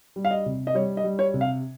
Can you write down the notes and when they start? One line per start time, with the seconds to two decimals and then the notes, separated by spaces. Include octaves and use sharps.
0.16 G3
0.25 F5
0.31 D#5
0.46 C3
0.67 D#5
0.74 G3 C#5
0.97 D#5
1.04 G3
1.19 C#5
1.34 C3
1.41 F5